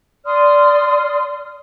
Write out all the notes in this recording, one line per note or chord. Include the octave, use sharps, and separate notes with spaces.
D5 C6 D#6 F6